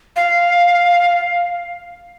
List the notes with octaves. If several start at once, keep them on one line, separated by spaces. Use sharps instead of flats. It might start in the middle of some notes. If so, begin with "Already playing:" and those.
F5